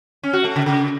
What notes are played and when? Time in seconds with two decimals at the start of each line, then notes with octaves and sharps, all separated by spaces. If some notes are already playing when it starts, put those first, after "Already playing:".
0.23 C#4
0.33 F#4
0.44 A3
0.56 C#3
0.66 C#3